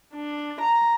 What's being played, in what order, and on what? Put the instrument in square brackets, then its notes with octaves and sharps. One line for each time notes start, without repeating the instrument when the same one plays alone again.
[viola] D4
A#5